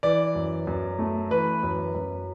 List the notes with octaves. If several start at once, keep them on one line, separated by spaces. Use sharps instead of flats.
E3 D5
F#2
F#2
A3
E3 B4
F#2
F#2